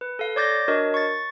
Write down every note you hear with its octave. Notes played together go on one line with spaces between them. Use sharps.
B4
A4 F5
C#5 D5 D6 G6 A6 A#6
D4 F#4 A#4 C#5 D#5
C#6 A6